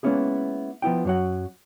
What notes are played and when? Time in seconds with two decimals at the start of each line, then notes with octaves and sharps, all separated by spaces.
0.03 G#3 A#3 B3 C#4 E4 G#4
0.82 F3 B3 E4 G5
1.05 F#2 F#3 F#5